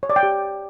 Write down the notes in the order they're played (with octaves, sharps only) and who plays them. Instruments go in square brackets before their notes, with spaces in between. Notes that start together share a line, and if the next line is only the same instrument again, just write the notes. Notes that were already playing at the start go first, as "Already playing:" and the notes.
[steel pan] C#5
D5
G5
G4